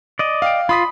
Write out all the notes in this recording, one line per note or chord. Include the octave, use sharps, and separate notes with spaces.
D5 D#5
F5 G5 D7
F4 B5 D#6 B6